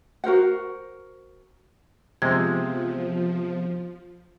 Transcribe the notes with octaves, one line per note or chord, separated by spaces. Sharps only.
F#4 A#4 C5 F#5
C3 F3 G#3 B3 G#6